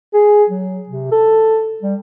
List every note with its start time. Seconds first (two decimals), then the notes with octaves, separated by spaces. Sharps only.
0.14 G#4
0.49 F#3
0.89 C3
1.12 A4
1.82 G3